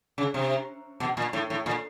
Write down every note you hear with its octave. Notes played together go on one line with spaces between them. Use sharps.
C#3
C3
B2
A#2
A2
A2
A#2